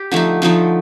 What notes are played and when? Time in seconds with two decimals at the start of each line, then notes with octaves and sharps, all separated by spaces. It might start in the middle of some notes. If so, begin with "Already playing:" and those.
Already playing: G4
0.11 D3 F3 A3 D#4
0.42 D3 F3 A3 D#4